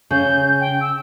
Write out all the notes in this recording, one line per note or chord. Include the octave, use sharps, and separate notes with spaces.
C#3 G6
G5
E6